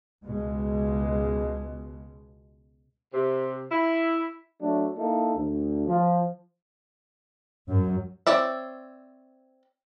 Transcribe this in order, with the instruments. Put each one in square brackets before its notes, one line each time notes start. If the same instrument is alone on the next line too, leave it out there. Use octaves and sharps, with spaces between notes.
[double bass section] C#2 B2 G#3
[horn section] C3
E4
[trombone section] F#3 A3 D4 F#4
A#3 D#4 E4 A4
D2
F3
[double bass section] F#2
[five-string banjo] C4 C#5 D5 E5